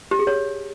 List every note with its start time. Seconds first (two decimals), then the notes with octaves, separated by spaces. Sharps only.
0.11 G4
0.19 G#4
0.27 C#5